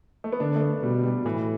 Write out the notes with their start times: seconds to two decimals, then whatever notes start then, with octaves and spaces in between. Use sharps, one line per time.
0.24 A3
0.32 B3
0.40 D3 D4
0.56 A3
0.61 B3
0.83 B2 G3
1.03 G3
1.25 A2 E3